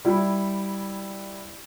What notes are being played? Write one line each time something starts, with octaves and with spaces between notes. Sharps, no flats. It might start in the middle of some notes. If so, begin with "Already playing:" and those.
G3 E4